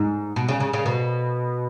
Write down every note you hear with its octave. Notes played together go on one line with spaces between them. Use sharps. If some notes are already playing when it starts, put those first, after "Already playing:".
Already playing: G#2
B2
C#3
C#3
C#3
B2